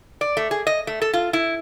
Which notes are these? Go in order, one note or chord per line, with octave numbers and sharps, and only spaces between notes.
D5
A3
G#4
D#5
A3
A4
F4
E4